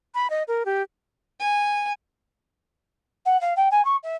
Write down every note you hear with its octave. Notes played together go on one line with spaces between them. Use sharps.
B5
D#5
A#4
G4
G#5
F#5
F5
G5
G#5
C#6
E5